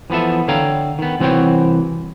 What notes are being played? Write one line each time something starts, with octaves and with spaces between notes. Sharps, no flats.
E3 F3 B3 A4 E5
D3 A4 C#5 F5 G5 A#5
D#3 B3
C2 E3 C4 F#4 C#5 G5